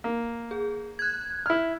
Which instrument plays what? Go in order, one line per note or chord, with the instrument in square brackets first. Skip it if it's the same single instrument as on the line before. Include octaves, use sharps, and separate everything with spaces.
[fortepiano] A#3
[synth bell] G#4
F#6 G#6
[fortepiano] E4 F6